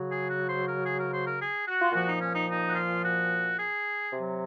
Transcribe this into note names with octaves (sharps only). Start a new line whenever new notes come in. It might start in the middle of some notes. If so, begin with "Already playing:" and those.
Already playing: C#3 F#3
G#4
F#4
C5
A#4
G#4
A#4
C5
A#4
G#4
F#4
F4
A#2 F3 F#4
D#4
C#4
D#4
D#4
F#4
F4
F#4
G#4
C3 F#3